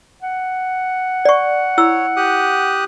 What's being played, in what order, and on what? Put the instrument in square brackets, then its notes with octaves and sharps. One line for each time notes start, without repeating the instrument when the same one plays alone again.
[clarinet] F#5
[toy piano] D5 C#6
[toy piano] E4 E6 [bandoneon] C#5
[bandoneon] G4 D#6 F#6